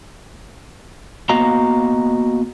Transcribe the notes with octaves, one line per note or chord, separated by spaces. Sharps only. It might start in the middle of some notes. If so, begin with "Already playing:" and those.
A#3 B3 F#4 D#5 F5 A#5